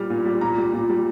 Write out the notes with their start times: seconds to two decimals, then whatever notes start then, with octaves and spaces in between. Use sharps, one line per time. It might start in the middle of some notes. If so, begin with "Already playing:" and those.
Already playing: A#2 G3 F6
0.10 A#2
0.26 G3
0.41 A#2 A#5
0.58 G3
0.73 A#2
0.90 G3